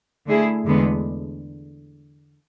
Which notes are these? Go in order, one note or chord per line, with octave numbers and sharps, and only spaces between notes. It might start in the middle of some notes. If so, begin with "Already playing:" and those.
D3 A3 E4 G#4
E2 D3 G#3 B3